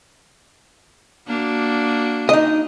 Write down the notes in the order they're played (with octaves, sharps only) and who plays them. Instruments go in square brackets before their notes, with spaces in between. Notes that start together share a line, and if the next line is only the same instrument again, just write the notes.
[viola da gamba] A#3 D4 F#4
[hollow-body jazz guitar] D#4 D#5